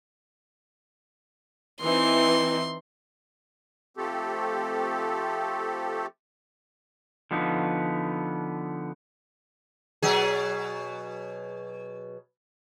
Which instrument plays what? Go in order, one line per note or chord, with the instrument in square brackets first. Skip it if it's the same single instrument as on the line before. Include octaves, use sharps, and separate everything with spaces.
[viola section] E3 C4 D#4 [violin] C6
[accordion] F3 A3 C4 G4 A4
[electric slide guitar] D3 F3 B3 D#4
[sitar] B2 F#3 G#4